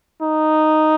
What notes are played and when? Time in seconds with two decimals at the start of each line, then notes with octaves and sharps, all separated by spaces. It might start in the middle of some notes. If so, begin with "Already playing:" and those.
0.22 D#4